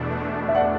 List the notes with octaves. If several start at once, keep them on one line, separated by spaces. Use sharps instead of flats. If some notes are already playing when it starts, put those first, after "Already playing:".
Already playing: E2 B2 A3 D4
E5
D5 F#5